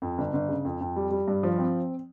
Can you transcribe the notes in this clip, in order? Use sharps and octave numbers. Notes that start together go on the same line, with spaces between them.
F2
G1
G1
C#3
F2
F2
G3
G3
G2
F3
C4